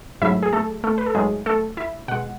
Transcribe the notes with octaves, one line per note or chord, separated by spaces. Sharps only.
G#2 F#3 A3 E4 E5
G#4
A3 A4
A3 A4
B4
A4
G#2 F#3 G#3 A3 G#4
A3 A4
E4 E5
B2 G#3 F#5